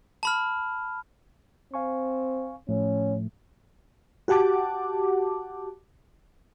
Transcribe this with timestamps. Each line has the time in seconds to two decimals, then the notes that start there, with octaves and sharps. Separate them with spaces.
0.23 A5 B5 F6
1.74 C4 F5 G#5 C#6
2.69 A2 F3 A3 C#4
4.28 F#4 G4 F#5 A5 D6